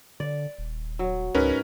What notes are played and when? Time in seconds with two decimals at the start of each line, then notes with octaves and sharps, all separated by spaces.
0.20 D3 D5
0.58 D#1
0.99 F#3
1.35 C#2 G#2 C#4 A#4 B4